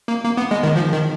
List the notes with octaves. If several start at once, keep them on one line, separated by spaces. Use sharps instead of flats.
A#3
A#3
B3
G#3
D#3
F3
D#3